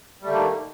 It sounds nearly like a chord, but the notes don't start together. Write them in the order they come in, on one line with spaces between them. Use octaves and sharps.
G3 A3 D3 A#3 D#3